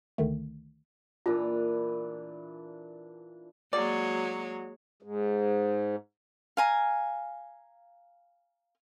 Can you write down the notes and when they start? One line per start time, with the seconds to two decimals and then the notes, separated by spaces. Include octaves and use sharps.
0.18 C#2 D3 D#3 A3
1.26 A#2 E3 D4 F4
3.73 F#3 G#3 A#3 C#5 D5
5.02 G#2
6.57 F5 G#5 A#5